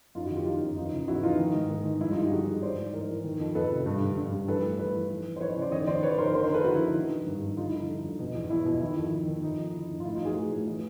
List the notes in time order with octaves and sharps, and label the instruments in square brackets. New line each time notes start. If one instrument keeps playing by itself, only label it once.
[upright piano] F#2 D#4 F4
E4 F#4
D#3
F4 G4
D#3 D#4 F4
F#2
E2 D#4 F4
C#3
E2 E4 F#4
E3 D#4 F4
D#3 D#4
G#2
D#3
G#2
G2 E4
D#4 F4
G2
F4 G4
D3 F#4 G#4
D3
E3 C5 D5
G#2
E3 A#4 C5
E3
D#3
F2
F2 A4 B4
C3
G2
D3
G2
G2
E3 A4 B4
A2
E3 A4 B4
E3
E3
E3
C5
E3 B4 C#5
C5 D5
C#3
C5 D5
D#3 C#5 D#5
D#3 C5 D5
D#3 B4 C#5
D#3 A#4 C5
D3 A#4 C5
A#4 C5
D3 A4 B4
D3 E4 F#4
E4
D3
D#4
D#3
D#3
G2
G2
D3 D#4 F4
E4
D3
D#4
D3
F2
B2
E2
E2 E4
B2
D#3 E4
F2
D#3
D#3
F2 D#4
F2
D3 E4
F2
F4
A2 E4
D#4 F4
E3 F#4 G#4
A2
A2
E3